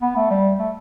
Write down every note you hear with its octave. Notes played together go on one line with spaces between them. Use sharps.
B3
A3
G3
A3